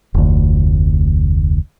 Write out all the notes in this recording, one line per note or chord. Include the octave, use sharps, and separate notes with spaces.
F1 D2